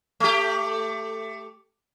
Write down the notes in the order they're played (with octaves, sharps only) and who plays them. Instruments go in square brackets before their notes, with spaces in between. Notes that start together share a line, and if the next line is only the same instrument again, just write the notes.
[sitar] A3 G4